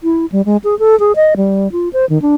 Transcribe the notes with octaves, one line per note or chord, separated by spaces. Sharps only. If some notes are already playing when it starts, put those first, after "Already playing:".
E4
G3
G#3
G#4
A4
G#4
D#5
G3
F4
C5
D#3
D4